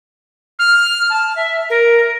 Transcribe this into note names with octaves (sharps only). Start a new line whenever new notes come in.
F6
A5
E5
A#4